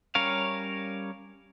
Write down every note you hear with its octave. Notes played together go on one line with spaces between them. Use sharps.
G3 C#4 A#4 C#5 F5